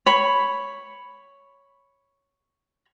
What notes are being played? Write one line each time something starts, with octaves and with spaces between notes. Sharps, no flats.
C#5 B5